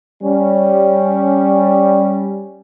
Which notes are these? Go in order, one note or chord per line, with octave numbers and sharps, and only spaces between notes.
G3 C#4